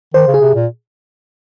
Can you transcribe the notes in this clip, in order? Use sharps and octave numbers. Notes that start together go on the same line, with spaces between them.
D#3 C5
C#3
G#4
C3
A#2